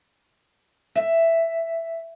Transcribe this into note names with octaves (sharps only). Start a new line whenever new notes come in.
E5